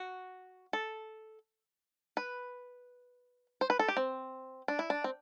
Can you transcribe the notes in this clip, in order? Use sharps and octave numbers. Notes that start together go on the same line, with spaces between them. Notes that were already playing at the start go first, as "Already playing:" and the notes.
Already playing: F#4
A4
B4
C5
B4
A4
G4
C4
D4
E4
D4
C4